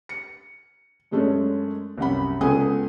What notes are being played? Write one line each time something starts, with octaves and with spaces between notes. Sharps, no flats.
C#7
F#2 G#3 A3 C#4 D4
C2 F#2 F#5 B5
C#2 B3 A4 F#5 G#5 D#6